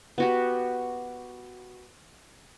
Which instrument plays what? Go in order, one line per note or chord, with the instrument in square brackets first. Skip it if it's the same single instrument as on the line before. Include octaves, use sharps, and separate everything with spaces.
[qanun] B3 F#4 G4